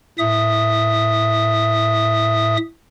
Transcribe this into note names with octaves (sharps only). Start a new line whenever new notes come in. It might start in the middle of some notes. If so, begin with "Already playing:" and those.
A2 E5 D#6